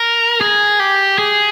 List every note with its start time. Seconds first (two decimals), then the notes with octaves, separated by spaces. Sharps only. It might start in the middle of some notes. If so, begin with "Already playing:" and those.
Already playing: A#4
0.41 G#4
0.80 G4
1.18 G#4